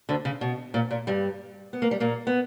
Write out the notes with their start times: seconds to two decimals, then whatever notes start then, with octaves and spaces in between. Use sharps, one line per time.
0.09 D2 D3
0.25 C#3
0.41 B2
0.74 A#2
0.91 A#2
1.07 G2 G3
1.73 B3
1.82 A#3
1.91 G3
2.00 A#2 A#3
2.27 B3